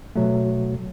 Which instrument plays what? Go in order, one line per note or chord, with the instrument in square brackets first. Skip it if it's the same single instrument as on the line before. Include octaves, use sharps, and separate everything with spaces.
[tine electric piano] B2 F#3 A3